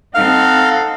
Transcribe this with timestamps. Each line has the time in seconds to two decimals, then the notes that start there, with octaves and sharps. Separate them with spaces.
0.14 C4 D#4 A4 F5 F#5